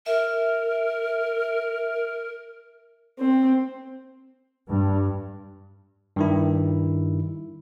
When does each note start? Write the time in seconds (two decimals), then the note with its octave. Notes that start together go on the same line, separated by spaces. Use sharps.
0.06 A#4 E5
3.19 C4
4.67 G2
6.16 G2 D#3 E4